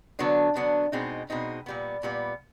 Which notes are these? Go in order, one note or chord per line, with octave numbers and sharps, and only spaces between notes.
D3 F#3 B3 D4
D3 F#3 B3 D4
B2 G#3 C4 D#4
B2 G#3 C4 D#4
A#2 G3 B3
A#2 G3 B3